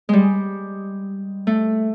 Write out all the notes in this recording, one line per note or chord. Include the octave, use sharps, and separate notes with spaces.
G3 G#3
A3